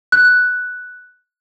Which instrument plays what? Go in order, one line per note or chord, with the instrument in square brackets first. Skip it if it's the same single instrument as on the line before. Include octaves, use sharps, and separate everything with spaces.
[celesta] F#6